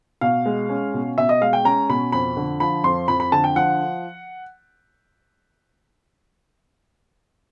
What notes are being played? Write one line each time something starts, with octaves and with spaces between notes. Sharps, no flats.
B2 F5
G#3
C#4
B2
B2 E5
D#5
G#3 F5
G5
C#4 A#5
B2 B5
F2 B5
D3
F3 B5
F2 C6
F2 B5
B5
D3 A5
G5
F3 F#5